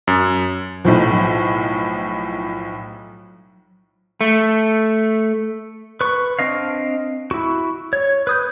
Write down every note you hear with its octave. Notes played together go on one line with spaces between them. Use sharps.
F#2
B1 A2 F3 F#3 C5
A3
B4 C#6
C4 D4 D#5 F5
E4 F#4
C#5
B4 D#6 G6